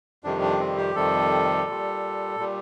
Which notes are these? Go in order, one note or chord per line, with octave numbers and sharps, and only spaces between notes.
F2 C3 D#3 G3 D4
D4
C4
G4
F2 C3 D#3 G3 A4
A#2 G3
A#2 G3